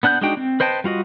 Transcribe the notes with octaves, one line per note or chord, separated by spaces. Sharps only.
B3 D4 F#5 F#6 G6
G#3 D4 D#4 F#4 G5
C4
B4 C5 D#5 G5 A5
G3 F4 F#4 D#5